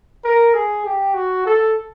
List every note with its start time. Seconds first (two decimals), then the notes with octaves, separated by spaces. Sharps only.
0.24 A#4
0.54 G#4
0.85 G4
1.15 F#4
1.46 A4